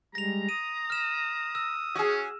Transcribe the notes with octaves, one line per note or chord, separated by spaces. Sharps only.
G3 G#3 A#5 A#6 F7
D#6 D#7
F6 E7
E6
C#4 F#4 G#4